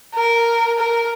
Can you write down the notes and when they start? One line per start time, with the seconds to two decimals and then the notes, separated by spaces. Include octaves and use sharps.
0.15 A#4
0.78 A#4